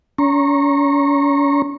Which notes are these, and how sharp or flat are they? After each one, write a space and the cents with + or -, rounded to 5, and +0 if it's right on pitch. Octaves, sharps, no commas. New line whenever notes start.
C#4 +40 A#5 +0 C#6 -30